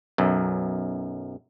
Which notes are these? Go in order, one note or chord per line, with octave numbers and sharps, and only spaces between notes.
B1 F#2